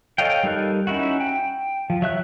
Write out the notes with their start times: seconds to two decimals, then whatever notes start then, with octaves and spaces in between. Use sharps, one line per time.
0.18 A4 C#5 D#5 F5 G5
0.43 G3 D#4 A4 A#4 F#6
0.87 C#4 D#4 E4 F#4
1.20 G5
1.90 F3
2.02 F#3 E5 F#6